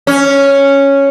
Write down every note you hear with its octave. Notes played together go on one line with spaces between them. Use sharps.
C#4